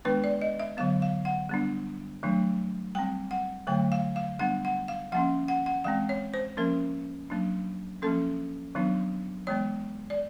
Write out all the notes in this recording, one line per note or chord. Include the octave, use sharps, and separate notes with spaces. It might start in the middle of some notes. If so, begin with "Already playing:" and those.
D#3 G#3 B3 D4 B4
D5
D#5
E5
D3 F#3 B3 F5
F5
F#5
G3 B3 D4
D#3 F#3 A3 D4
G3 C4 G5
F#5
D3 F#3 A3 G5
F5
F5
G3 B3 D4 F#5
F#5
F5
F3 A#3 C#4 F#5
F#5
F#5
E3 G#3 C4 F5
C#5
C5
F3 A#3 C#4 A#4
F#3 A#3 D4
F3 A#3 C#4 A4
D#3 F#3 B3 D4
E3 G#3 B3 C#5
D5